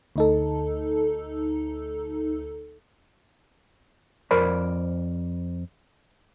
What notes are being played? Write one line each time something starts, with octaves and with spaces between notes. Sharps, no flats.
D2 D#4 A4
F2 A#4 C5 D5 B5